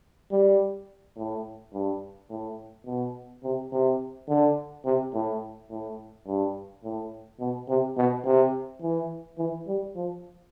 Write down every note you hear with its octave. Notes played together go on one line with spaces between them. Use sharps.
G3
A2
G2
A2
B2
C3
C3
D3
C3
A2
A2
G2
A2
B2
C3
B2
C3
E3
E3
G3
F3